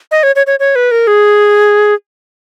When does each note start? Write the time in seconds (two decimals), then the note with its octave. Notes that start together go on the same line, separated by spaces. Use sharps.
0.11 D#5
0.23 C#5
0.36 C#5
0.47 C#5
0.60 C#5
0.76 B4
0.91 A#4
1.07 G#4